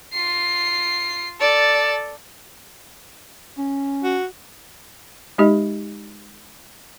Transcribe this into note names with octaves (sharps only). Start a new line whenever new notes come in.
F4 C7
A4 D5
C#4
F#4
G#3 D#4 G4 D#5